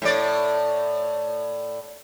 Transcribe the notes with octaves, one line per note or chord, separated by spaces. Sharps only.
A2 D5